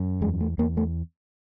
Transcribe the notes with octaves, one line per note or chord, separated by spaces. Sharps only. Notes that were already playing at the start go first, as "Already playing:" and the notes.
Already playing: F#2
E2 G#3
A3
E2 A#3
A3